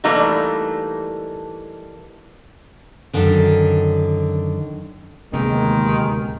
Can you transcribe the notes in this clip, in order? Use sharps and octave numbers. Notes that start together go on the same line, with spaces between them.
E3 G3 A3 A#3 D4 D#4
F#2 D3 D#3
D1 D#2 C3 D#3 G#3 B3